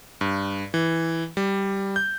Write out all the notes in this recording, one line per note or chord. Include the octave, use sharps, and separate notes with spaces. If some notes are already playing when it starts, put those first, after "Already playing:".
G2
E3
G3
G6